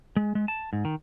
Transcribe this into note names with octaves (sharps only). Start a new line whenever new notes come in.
G#3
G#3
A5
G#2
D#3